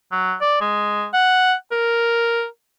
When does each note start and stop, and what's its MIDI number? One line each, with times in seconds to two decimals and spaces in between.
0.12 0.34 54
0.41 0.57 74
0.61 1.06 56
1.14 1.54 78
1.72 2.46 70